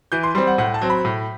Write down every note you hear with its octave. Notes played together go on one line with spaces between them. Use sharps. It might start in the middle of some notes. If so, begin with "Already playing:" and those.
E3 G6
C6
G3 C4 C6
F#5
A2 F#5
A5
F#3 C4
B5
A2